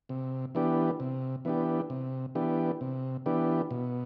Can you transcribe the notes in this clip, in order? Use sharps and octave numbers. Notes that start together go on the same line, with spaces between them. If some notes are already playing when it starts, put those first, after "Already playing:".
C3
E3 B3 D4 G4
C3
E3 B3 D4 G4
C3
E3 B3 D4 G4
C3
E3 B3 D4 G4
B2